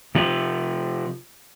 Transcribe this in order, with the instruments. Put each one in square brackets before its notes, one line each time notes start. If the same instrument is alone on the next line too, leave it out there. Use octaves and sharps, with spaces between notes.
[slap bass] C3 F3